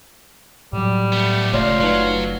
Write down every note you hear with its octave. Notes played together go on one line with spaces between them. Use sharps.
A2 F#3 G3
A3 B3
F#1 C#2 A3 F4 C#5 D5 E5
F#3 D#4 B4 D5